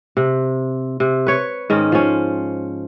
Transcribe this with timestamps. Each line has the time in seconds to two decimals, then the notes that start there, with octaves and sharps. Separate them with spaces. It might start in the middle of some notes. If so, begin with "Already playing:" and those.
0.17 C3
1.00 C3
1.27 B4 C#5
1.70 G#2 D#3 C#4
1.92 F3 C#4